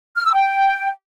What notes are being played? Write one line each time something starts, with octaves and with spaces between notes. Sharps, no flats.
F6
E6
G5